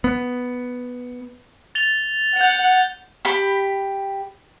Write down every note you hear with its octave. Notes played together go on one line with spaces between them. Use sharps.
B3
A6 F7 G7
F#5 G6 F7
G4 B5